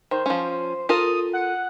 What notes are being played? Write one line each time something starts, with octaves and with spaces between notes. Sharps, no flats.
D#3 C5
F3 C#4
F4 A4 A#4 D#6
F#5